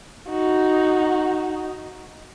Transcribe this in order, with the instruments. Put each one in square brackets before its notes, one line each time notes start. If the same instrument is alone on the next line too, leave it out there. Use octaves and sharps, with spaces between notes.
[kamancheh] D#4 F#4